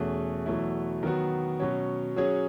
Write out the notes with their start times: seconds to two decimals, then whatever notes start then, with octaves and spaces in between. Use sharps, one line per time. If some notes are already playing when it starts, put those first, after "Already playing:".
Already playing: E2 B2 A3 C#4 G#4
0.46 E2 B2 F#3 A3 E4
1.03 D#3 F#3 B3 F#4
1.60 B2 F#3 C#4
2.16 F#3 C#4 G#4 C#5